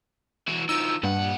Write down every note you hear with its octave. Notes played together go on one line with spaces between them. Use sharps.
E3 F#4
D#3 F3 E6
G2 A#2 F#5